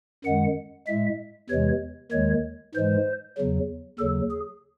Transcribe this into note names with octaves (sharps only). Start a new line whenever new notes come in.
F#2 D#3 G#3 F#5
A2 G#3 E5
E2 C3 E3 G#3 C#5
D#2 D#3 G#3 C#5
G#2 E3 G#3 C5
E2 C#3 F#3
D#2 C#3 F#3 A4
G#4